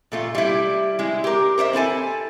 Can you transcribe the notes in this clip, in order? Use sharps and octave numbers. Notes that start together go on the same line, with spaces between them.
A#2 A3 F4
G3 E4
G#3 E4
G4 A#4
A#4 C5 D5 E5
C4 E4 A4 G#5